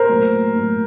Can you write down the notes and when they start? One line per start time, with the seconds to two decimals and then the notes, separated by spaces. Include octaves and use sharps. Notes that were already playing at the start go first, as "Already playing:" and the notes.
Already playing: A#4 C5
0.09 A2 F#3 A#3
0.56 A2 F#3 A#3